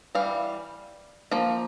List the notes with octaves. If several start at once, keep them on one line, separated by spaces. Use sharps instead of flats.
E3 G3 F5
F3 A#3